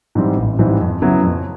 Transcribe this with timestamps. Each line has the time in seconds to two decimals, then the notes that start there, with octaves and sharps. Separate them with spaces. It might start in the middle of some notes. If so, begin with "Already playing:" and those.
0.15 G#2 E3 G3 C4
0.37 A1
0.59 G#2 E3 G3 C4
0.80 F2
1.01 C#3 F#3 B3 E4
1.23 F2